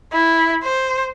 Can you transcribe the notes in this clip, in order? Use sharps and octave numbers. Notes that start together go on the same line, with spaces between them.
E4
C5